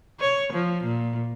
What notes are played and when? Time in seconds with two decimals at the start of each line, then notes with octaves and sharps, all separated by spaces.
0.20 C#5
0.53 F3
0.84 A#2